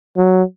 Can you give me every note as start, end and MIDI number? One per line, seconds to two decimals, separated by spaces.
0.17 0.43 54